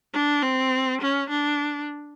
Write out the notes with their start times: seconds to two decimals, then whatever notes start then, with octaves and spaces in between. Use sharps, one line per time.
0.14 D4
0.43 C4
1.01 C#4
1.30 D4